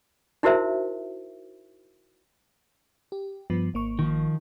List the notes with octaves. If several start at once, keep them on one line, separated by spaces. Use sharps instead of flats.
D#4 E4 F#4 A#4 C5 E5
G4
G2 F3 B3
G#1 A#3 C#6
D#3 F3